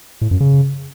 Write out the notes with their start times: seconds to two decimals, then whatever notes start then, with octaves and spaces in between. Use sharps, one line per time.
0.21 A2
0.31 F#2
0.40 C#3